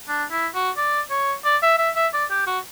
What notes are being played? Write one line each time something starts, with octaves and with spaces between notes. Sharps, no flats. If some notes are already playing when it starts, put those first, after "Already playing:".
D4
E4
F#4
D5
C#5
D5
E5
E5
E5
D5
G4
F#4